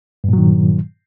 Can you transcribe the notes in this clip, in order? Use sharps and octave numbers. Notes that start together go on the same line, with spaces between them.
G2 A#2 D#3 F#3